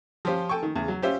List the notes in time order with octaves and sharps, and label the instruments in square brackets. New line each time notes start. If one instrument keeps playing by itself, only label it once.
[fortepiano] F3 C#4 F4 G4 C5
A4 G5 G#5 C#6
D#3
E2 C#3
F#3
C#4 F4 G4 C5 E5